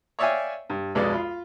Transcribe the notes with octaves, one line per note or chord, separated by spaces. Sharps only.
C#5 D5 E5 F5 G5 G#5
G2
B1 F2 F#3 G#3 B3 D5
F4 B5